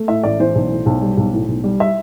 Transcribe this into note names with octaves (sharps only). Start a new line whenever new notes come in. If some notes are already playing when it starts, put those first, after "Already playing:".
Already playing: A3
A2 E5
A1 D5
E3 C5
B1
A2
B1
G3
B1
A2
B1
G3
E5